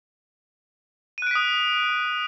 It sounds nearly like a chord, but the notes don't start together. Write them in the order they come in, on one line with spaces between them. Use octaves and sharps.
D#7 F#6 D7 B6 D#6